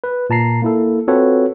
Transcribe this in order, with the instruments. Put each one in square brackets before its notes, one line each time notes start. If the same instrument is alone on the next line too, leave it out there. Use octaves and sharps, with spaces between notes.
[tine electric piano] B4
A#2 A5 A#5 C7
A#3 E4 A4
C4 F4 F#4 A4 B4 C#5